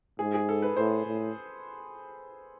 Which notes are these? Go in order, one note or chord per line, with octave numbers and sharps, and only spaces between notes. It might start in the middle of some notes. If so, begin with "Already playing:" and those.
G#2 G#4
G#4
A4
B4
A2 C5
A2